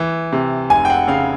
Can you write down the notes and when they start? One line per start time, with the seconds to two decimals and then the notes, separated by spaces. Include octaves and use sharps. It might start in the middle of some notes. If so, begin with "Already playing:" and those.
Already playing: E3
0.32 C3
0.70 F1 G#5
0.85 G5
0.90 F#5
1.08 C#3 F5